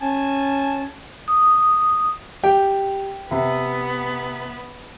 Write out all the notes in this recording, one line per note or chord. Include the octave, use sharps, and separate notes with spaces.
C#4 G#5 A5
D#6
G4 G5
C3 B3